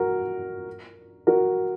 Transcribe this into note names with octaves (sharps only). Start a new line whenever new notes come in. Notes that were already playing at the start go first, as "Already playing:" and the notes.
Already playing: F#4 A#4
F#4 A#4